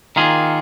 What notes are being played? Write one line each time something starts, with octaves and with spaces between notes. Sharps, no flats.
D#3 A#3 F4 G#4